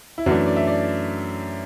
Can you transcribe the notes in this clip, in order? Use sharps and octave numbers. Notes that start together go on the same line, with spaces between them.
E4
F#2 E3 A3 D4 F#4
D5
E5
D5